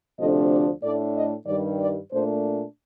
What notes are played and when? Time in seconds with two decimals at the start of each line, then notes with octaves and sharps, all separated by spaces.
0.19 D2 C3 F3 A3 D4 D#5
0.50 D5
0.83 A2 A3 D4 D5
1.15 D#5
1.47 G2 D#3 G3 D5
1.80 D5
2.12 A#2 A3 D4 C5